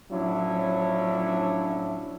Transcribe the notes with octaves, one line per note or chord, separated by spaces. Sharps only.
A2 F3 F#3 C#4 D4 E4